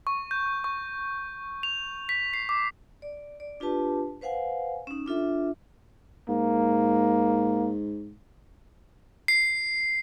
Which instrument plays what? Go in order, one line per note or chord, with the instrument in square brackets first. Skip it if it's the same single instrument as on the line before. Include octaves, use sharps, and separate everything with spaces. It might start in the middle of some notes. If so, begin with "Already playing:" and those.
[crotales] C#6
G6
C#6
F7
B6
C7
D6
[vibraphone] D5
D5
D4 F4 G4 B4 A5
B4 C5 F5 F#5 G#5
C#4 D#4
D4 F4 A4 E5
[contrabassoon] G#2 [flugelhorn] A#3
[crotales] C7